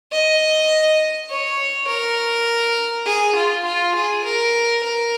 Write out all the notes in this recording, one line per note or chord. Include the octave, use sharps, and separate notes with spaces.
D#5
C#5
A#4
G#4
F4
F4
G#4
A#4
A#4